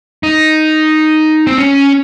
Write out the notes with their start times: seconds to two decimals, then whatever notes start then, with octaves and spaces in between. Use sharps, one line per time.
0.23 D#4
1.47 C4
1.58 C#4